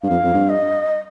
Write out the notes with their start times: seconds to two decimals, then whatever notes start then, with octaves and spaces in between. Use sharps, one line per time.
0.02 G2 F5
0.09 F2
0.24 F2
0.34 G2
0.49 D#5